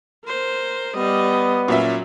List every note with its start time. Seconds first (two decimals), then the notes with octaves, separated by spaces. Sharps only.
0.25 A#4 C5
0.97 G3 B3 D#5
1.68 A#2 F#3 C#4 E5